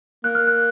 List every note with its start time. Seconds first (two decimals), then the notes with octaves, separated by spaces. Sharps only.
0.24 A#3 F#6
0.35 F6
0.47 F#6